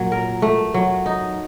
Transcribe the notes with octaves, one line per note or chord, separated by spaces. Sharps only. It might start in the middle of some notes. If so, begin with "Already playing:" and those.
Already playing: A#2 F#3
A#4
A3
F#3
D#4